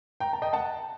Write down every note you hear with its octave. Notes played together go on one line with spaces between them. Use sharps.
G5 A#5
A5
D#5 G5
F#5 A5